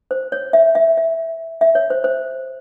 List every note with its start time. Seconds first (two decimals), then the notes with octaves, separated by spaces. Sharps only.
0.11 C5
0.32 C#5
0.53 E5
0.75 E5
0.97 E5
1.61 E5
1.75 C#5
1.90 C5
2.04 C5